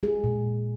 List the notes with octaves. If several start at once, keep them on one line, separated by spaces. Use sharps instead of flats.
G#3 G#4
A#2